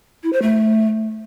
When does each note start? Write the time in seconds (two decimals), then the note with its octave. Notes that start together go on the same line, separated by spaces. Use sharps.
0.23 E4
0.33 C5
0.42 A3